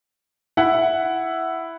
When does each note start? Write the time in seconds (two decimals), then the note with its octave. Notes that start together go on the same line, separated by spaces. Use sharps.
0.57 E4 F#5